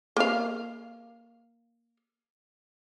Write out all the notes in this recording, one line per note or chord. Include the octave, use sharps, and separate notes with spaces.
A#3 F5